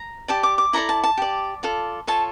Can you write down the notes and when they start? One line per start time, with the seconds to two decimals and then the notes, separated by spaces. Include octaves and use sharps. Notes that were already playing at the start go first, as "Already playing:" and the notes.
Already playing: A#5
0.28 G4 D5 A5
0.43 D6
0.58 D6
0.73 E4 A4 D5 A#5
0.89 A5
1.04 A5
1.17 G4 D5
1.63 F4 A4 D5
2.07 F4 A4 C#5 A5